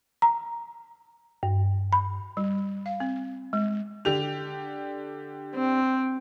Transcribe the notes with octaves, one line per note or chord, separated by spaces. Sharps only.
A#5
G2
B5
G3
F5
C4
G#3
D3 G4 F7
C4